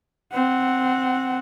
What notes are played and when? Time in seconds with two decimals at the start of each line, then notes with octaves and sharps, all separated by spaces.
0.32 C4 F#5